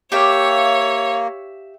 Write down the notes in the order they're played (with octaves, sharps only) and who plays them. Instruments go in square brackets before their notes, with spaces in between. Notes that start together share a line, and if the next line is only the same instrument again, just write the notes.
[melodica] A#3 [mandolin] G4 E5 F5 [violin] C#5